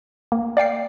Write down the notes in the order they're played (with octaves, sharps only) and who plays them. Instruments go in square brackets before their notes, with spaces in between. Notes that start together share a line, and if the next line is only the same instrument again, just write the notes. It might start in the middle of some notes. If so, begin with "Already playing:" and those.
[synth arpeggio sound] A#3
D5 F5 G5 C7